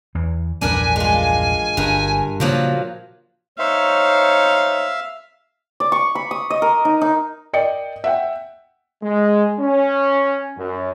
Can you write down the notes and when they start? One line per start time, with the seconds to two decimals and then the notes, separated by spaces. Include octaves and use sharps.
0.15 E2 E3
0.61 A#1 E2 G2 D4 A#4 B4 G#5
0.96 G#3 F4
1.77 G1 G2 A#4
2.40 A#2 C#3 F3 F#3 A#3
3.59 D#4 C5 C#5 E5 F5
5.80 D5
5.92 C#6
6.15 B5
6.31 D#6
6.50 D#5
6.62 A#4
6.85 D#4
7.01 D#4
7.53 A#4 D5 D#5 G5 C#7
8.04 E5 F#5 G5
9.02 G#3
9.59 C#4
10.57 F#2